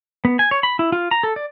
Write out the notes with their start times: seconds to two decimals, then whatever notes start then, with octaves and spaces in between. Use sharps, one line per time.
0.25 B3
0.39 G#5
0.51 C#5
0.63 B5
0.79 E4
0.92 F4
1.11 A#5
1.23 A4
1.36 D5